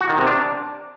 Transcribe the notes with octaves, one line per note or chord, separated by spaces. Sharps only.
F#4
D#3
C3
D4